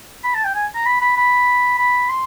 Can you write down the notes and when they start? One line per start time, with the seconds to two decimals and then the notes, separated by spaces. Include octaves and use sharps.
0.24 B5
0.34 A5
0.44 G5
0.55 G#5
0.75 A#5
0.86 B5
1.01 B5
1.17 B5
1.78 B5
2.09 C6